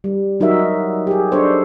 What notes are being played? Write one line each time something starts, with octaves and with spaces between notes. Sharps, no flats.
G3
F#3 D#4 F#4 A#4 E5
G4 G#4
D4 G#4 A4 C5 C#5